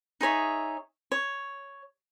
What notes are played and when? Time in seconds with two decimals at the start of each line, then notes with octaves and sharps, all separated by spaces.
0.21 D#4 G#4 C#5 E5
1.12 C#5